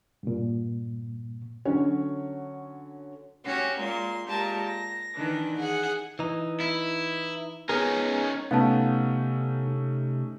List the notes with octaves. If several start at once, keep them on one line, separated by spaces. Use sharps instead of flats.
G2 A#2
D3 F#3 C#4 C#5
C#4 F#4 G4
A#2 G#3 C6
A#2 G#3 G4 A5 A#5
A#6
D#3 E3 D4 B4
G#4 F#5
E3 D#4
E4
B3 C#4 D#4 G#4 A#4
C3 A3 B3 C#4 D#4 F5 A5